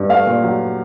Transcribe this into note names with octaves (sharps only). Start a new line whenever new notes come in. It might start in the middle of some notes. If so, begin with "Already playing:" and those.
Already playing: G2
A3 F5
A#2
F#3